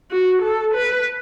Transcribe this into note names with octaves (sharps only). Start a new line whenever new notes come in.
F#4
A4
B4